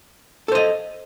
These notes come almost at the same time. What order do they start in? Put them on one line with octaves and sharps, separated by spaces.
A4 C5 D#5